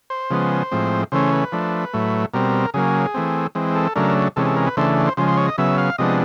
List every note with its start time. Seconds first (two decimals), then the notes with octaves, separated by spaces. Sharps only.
0.10 C5
0.30 C#3 F3 G#3 B3
0.71 A2 F3 G#3 C4
1.12 C#3 E3 A3 C#4 C5
1.33 B4
1.52 F3 A3 D4
1.93 A2 F#3 A3
2.33 B2 G3 C4 A#4
2.74 C#3 F#3 A#3 G#4
3.14 E3 A3 C4
3.55 E3 G#3 C4
3.75 A4
3.96 C#3 F#3 A3 D4 A#4
4.36 C3 E3 G#3 C#4 A4
4.46 A4
4.56 A#4
4.67 B4
4.77 C#3 E3 A3 D4 C5
5.07 C5
5.17 C#3 F3 G#3 C5
5.28 C5
5.37 C#5
5.47 D#5
5.58 C#3 F#3 B3 E5
5.78 F5
5.98 C3 F3 G#3 B3 D4 D#5